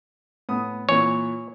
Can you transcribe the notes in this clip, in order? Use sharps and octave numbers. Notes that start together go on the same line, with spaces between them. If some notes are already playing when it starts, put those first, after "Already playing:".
A2 B3 D#6
A#2 E3 C#5